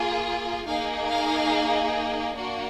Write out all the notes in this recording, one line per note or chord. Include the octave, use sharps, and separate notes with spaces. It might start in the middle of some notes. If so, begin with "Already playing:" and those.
Already playing: A#3 F4 G#4
A#3 D#4 G#4 F5
F5
A#3 D4 F#4